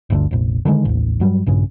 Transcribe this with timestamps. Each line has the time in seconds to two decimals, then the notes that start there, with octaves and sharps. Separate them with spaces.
0.10 G1 D2 A#2 D3
0.31 F1 A#1
0.65 D3 D#3 F#3 G#3
0.85 A1 D#2
1.20 G2 F#3 G3
1.46 A#1 G2 C#3